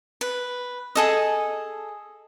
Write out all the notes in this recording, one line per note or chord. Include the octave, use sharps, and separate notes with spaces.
B4
G#4 A4 D#5